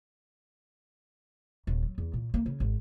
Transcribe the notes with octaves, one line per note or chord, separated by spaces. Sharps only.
D#1
F#3
E2
A#2
A#3
C#3
G#1